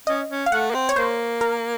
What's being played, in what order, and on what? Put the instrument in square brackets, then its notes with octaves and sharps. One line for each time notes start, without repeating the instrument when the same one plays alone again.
[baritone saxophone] C#4 [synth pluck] D#5
[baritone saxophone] C#4
[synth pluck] F5
[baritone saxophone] A3 [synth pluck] F#5
[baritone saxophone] A#3
C4
[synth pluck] C#5
[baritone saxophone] A#3 [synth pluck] C5
[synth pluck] A#4